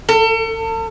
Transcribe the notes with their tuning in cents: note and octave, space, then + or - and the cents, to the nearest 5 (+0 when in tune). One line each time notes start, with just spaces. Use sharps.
A4 +40